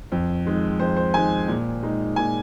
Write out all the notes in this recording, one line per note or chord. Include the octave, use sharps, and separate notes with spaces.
F2
D#3 G#3
F2 C5
C5
D#3 G#3 G#5
A#2
G#3 D#4
A#2 G#5